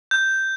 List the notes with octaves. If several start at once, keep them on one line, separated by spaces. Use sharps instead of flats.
G6